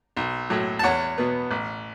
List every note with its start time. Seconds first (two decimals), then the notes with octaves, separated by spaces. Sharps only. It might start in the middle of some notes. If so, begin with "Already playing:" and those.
0.17 B1
0.50 A2 F#3
0.79 A5
0.83 E2 C#5 F#5
1.18 B2 B3
1.51 A1